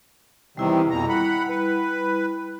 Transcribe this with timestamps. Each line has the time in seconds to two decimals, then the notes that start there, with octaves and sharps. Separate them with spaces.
0.57 E2 C3 D#3 G3 E4
0.91 F2 B2 A#5
1.09 F#5 B5
1.49 B4